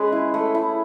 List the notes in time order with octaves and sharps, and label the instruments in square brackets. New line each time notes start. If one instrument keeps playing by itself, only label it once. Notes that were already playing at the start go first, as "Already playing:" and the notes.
Already playing: [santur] G#3 C#4 G#4 B4
E4
A3
E4